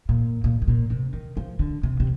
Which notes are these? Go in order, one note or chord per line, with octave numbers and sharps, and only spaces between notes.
A#2
A#2
G#2
A#2
C3
D#3
F3
D3
C3
C3